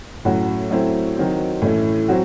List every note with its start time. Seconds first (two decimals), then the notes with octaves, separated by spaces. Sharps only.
0.25 A2 F#3 C#4 F#4
0.70 F#3 A3 C4 E4
1.17 D#3 F#3 C4
1.62 A2 E3 A3 C#4 E4
2.08 F#3 C4 F#4